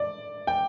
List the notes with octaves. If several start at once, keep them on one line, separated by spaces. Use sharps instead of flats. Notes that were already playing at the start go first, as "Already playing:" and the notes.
Already playing: D5
G5